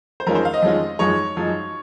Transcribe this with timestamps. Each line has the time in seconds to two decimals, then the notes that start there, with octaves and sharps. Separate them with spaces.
0.20 C5
0.27 F2 D#3 G#3 C#4 F4 A#4
0.35 C5
0.45 F5
0.54 D#5
0.62 F2 D#3 G#3 C#4 F4
0.99 F#2 F3 G#3 D#4 C#5
1.36 F#2 F3 G#3 D#4